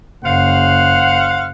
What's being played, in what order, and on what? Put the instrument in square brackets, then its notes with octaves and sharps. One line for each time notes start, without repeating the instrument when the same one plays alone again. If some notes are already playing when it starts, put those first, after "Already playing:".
[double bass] F#1 [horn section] C5 F5 F#5